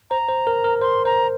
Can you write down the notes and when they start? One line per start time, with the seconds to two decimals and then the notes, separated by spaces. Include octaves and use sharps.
0.10 C5 A#5
0.29 C5
0.47 A#4
0.64 A#4
0.81 C5 C6
1.05 C5 A#5